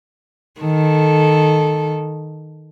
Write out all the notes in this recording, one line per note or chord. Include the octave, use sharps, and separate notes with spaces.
D#3 A4